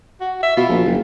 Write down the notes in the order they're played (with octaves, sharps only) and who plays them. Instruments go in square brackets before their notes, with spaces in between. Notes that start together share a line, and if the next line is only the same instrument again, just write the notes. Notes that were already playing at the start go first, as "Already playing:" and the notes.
[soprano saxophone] F#4
E5
[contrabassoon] B2 [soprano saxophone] F4
[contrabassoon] A#1
F#1